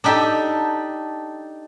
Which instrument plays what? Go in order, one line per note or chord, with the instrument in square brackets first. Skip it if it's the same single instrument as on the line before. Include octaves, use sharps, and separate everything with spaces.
[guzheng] D4 D#4 G4 A4